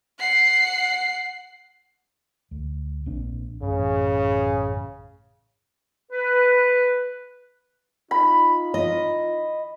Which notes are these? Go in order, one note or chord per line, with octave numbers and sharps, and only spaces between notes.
F#5 C7
D2
A#1 C4 D4
A1 F#2 C#3
B4
D#4 F4 B5
D#5